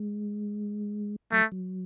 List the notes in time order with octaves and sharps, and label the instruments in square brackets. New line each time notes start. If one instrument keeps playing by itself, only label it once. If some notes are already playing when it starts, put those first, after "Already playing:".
Already playing: [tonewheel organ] G#3
[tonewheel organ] F#3 [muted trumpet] A3
[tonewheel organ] F#3